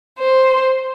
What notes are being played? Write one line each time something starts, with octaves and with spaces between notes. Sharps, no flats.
C5